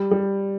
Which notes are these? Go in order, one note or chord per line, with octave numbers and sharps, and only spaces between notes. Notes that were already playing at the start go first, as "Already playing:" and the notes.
Already playing: G3
G3